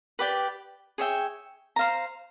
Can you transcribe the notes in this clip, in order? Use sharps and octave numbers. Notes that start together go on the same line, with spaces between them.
G4 B4 D5 G5
G#4 C#5 E5 G5
C5 F5 A#5